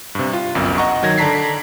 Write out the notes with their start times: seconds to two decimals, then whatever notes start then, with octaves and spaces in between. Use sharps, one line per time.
0.15 G2 C3
0.33 F4
0.55 G1 C2 F#2
0.78 D#5 F#5 A#5 C#6
1.03 D#3 F#3 G#6 A#6
1.18 D3 D5 A5 A#5 B6 C7